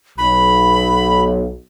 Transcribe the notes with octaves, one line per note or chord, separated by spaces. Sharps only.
B1 B5